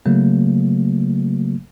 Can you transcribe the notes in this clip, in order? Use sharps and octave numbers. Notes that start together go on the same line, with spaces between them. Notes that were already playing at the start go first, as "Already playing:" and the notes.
C#3 F#3 A3 A#3